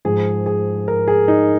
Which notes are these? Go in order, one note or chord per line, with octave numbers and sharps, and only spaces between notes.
G#2 F3 G#3 G#4
G#4
A#4
G#4
D#4